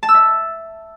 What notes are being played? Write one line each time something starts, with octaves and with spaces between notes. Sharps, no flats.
A5
E6
E5